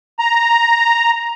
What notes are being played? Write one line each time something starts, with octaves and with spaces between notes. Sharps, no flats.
A#5